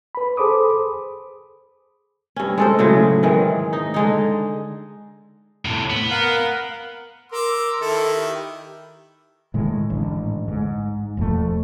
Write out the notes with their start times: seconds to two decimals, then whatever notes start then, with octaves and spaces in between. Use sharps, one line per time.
0.15 B4 B5
0.37 G#4 A4 C5 B5 D6 D#6
2.36 G2 C#4
2.58 G#3 A4 C5
2.79 A2 C#3 F#3
3.23 G#2 D#3 E3 G#3
3.73 D#4
3.94 D3 G#3 D#4
5.65 A2 C3
5.90 B3
6.10 A#4 F5 F#5
7.32 A#4 C6 D6 E6
7.81 D#3 E4 A4
8.15 G4
9.54 A2 D#3 G#3
9.90 A1 G#2 D3
10.48 G#2
11.17 E1 F2 F#3 A3